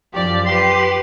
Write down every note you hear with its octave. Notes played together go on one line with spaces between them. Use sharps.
F#2 F3 G4 D5
G4 B4 C6